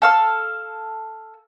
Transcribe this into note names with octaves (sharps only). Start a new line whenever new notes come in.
A4 F5 E6